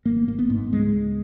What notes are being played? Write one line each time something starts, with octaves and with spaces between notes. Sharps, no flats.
G#1 A#3
G#1 A#3
B3
G#2
C#2 G#3
C#2